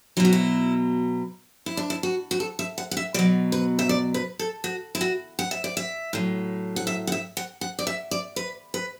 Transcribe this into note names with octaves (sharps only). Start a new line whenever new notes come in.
B2 F#3 E4 F#4
E4
E4
D4
E4
F#4
F#4
A4
E5
F#5
F#5
E5
B2 F#3 D5
B4
E5
D5
B4
A4
F#4
E4
F#4
F#5
E5
D5
E5
A2 F#3
F#5
E5
F#5
E5
F#5
F#5
D5
E5
D5
B4
B4